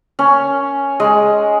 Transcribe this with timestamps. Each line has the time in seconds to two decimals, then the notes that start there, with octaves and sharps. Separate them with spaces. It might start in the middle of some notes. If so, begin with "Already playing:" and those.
0.19 C#4
1.00 G#3